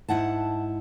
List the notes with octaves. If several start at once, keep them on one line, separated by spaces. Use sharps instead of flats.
G#2 E4 F#5 A5